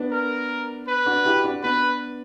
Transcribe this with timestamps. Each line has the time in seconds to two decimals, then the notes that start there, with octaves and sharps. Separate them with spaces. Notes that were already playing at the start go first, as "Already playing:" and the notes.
Already playing: B3 D4
0.11 A#4
0.88 B4
1.06 D4 F#4
1.25 E4 G4
1.44 D4 F#4
1.63 B3 D4 B4